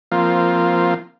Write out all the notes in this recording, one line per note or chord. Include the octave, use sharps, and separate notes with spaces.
F3 A#3 C4 F4